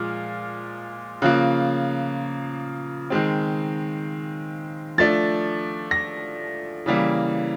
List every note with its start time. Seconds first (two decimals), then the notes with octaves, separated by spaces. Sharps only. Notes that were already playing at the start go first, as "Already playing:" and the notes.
Already playing: A#2 F3 G#3 F6
1.22 C#3 F3 A#3 F#6
3.10 D#3 G#3 C4
4.98 F3 A3 D4 A6
5.91 A#6
6.86 C#3 E3 G3 A#3